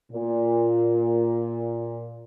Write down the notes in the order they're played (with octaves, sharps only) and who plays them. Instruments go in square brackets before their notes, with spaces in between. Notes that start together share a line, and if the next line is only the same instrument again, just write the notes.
[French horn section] A#2